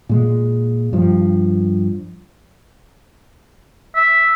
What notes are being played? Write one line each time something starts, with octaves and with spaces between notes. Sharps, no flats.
A#2 G#3
G2 F3
E5